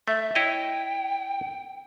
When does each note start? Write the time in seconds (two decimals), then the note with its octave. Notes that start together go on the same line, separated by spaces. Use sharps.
0.08 A3 E5
0.35 E4 C#5 D#5 G5